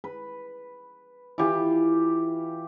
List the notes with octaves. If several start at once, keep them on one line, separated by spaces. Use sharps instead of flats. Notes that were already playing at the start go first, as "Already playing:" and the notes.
B4
E3 F4 G4 B4